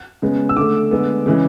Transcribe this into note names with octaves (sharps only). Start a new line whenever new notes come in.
C#3 G#3 B3
E6
D3 A3 D6
D3 G#3 B3
C#3 E3 G#3